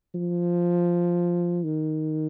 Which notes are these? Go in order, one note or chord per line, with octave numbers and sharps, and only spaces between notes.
F3
D#3